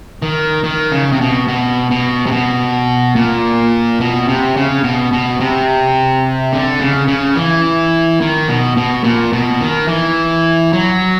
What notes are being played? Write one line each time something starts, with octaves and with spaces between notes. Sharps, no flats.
D#3
D#3
C#3
C3
B2
B2
B2
C3
B2
A#2
B2
C3
C#3
B2
B2
C3
D3
C#3
C#3
E3
D#3
B2
B2
A#2
B2
D#3
E3
F#3